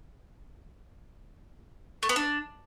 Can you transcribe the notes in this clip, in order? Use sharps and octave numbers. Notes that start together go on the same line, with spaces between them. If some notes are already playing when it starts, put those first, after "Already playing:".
A3
B3
D4